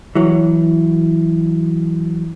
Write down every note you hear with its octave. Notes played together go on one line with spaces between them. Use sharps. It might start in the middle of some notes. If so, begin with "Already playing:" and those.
E3 F#3